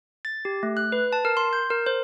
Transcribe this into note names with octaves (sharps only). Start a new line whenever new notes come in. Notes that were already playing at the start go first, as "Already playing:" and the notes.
A6
G4
A3
F#6
B4
A5
A#4
C6
G6
A#4
C5